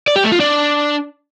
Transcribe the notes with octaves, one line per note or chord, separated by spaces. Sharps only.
D5
G4
A3
F4
D4